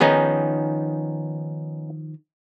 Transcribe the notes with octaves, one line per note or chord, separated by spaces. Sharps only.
D#3 F3 B3 C#4 D#4 G#4